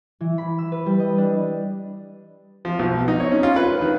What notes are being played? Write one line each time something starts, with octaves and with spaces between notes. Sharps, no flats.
E3
B5
E6
B4
G3
D#5
D4
F3
B1
D#4
C#5
C#4
F4
B4
D#3